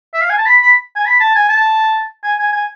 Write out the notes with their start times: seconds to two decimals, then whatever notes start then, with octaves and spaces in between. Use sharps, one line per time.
0.14 E5
0.22 F5
0.30 G#5
0.38 A5
0.46 B5
0.62 B5
0.96 G#5
1.06 B5
1.20 A5
1.36 G#5
1.50 A5
2.24 G#5
2.39 G#5
2.53 G#5